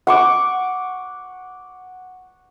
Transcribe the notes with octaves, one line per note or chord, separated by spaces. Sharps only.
F#5 C#6 D6